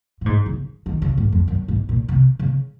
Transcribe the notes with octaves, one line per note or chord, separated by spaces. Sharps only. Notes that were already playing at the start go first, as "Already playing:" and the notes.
A#2
G#2
C#3
D#3
C#3
G#2
F2
F#2
G#2
A#2
C3
C#3